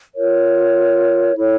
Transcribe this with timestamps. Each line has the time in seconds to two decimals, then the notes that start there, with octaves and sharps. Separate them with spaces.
0.14 F4 A#4 C#5
1.35 E4 A4 C#5